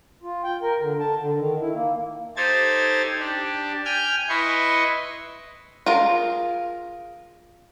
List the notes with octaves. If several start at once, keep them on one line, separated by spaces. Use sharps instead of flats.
F4
G5
A#4
D3
A5
D3
D#3
E4
A#3
D#4 G4 A4 C5 G#6 A6
D4 G4
G5 G#5 F6 G6 G#6
E4 B4 D#5 C6 C#6
F4 G#4 A#4